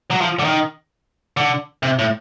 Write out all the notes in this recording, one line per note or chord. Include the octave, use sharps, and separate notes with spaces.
F#3
F3
D3
D#3
D3
C3
A2